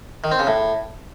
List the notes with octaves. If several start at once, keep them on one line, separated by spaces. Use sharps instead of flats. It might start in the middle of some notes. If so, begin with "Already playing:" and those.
D#3
C4
C#3
A2